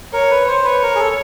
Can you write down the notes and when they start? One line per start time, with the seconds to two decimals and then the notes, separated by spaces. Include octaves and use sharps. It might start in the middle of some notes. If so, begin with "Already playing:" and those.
0.13 A#4 C#5
0.31 B4
0.48 C5
0.65 B4 C#5
0.83 A#4
0.96 G#4
1.00 A4